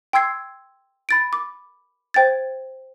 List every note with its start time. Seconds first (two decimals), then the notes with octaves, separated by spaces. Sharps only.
0.13 G5 C6 E6 G#6 C7
1.09 B5 A6 D7
1.33 D6
2.14 C5 G5 G#6 A6